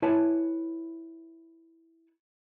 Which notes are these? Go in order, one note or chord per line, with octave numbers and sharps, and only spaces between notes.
E4 B4 C#5 G#5 A5